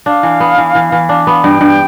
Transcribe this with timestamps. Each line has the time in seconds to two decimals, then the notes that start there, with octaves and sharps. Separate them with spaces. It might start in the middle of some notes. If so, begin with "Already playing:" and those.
0.06 D4 F5
0.23 E3
0.40 B3
0.58 E3
0.75 E3
0.92 E3
1.09 D4
1.27 B3
1.44 G2 G5
1.61 G2